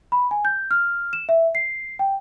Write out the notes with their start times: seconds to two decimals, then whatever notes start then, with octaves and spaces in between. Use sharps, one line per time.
0.12 B5
0.31 G#5
0.45 G6
0.71 F6
1.13 E7
1.29 E5
1.55 C7
1.99 G5